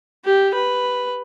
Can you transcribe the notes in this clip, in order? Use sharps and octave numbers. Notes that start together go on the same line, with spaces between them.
G4
B4